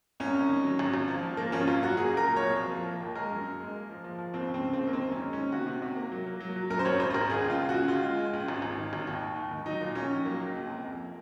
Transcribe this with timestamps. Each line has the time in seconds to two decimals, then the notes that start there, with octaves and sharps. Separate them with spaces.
0.20 C2 C#4
0.34 C2
0.49 D#3
0.64 F#3
0.79 G#1
0.94 G#1
1.08 F3
1.23 F3
1.37 F3 A#3
1.52 G#1 C#4
1.67 G#1 F4
1.82 F#2 F#4
1.97 A#3 G#4
2.12 A#2
2.17 A#4
2.26 F#3
2.36 C2 C#5
2.56 F3
2.71 F3
2.86 A#3
3.01 D#2
3.15 G#3 A#4
3.31 F#2
3.45 F#2
3.60 G#3
3.74 A#3
3.89 F3
4.04 F3
4.19 F3
4.34 D#2 C4
4.48 C#3
4.54 C4
4.63 C#3
4.73 D#2 C4
4.88 A#3
4.93 D#3 C4
5.08 F#2 C#4
5.22 G#3
5.33 D#3 C#4
5.52 C3 F#4
5.67 C3
5.82 C3
5.96 A#3
6.12 F#3
6.27 A#3
6.40 F#3
6.56 F#3
6.70 F#2 A#4
6.79 C5
6.85 G#1 C#5
7.00 G#1 C5
7.10 C5
7.14 G#1 A#4
7.30 C#2 G#4
7.44 C#2
7.50 F4
7.59 C#3
7.69 F#4
7.74 C#3
7.88 C#2 F4
8.03 G#3
8.19 G#3
8.33 C#2
8.48 G#1
8.62 G#1
8.78 D#3
8.93 G#1
9.07 D#2
9.22 D#2
9.36 D#2
9.51 D#3
9.66 F#3 D#4
9.81 A#2
9.95 A#1 C#4
10.11 A#1
10.25 F#3 A#3
10.40 C#2
10.56 C#2
10.70 C3
10.85 F2